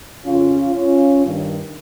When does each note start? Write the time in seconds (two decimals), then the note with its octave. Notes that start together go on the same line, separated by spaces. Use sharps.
0.24 F2 C#3 C#4 F4
0.74 C#4 F4
1.24 G2 D#3